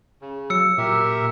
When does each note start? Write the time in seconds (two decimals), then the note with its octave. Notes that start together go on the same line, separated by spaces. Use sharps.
0.22 C#3
0.50 F#3 E6 C#7
0.78 A#2 G4 A#4 E5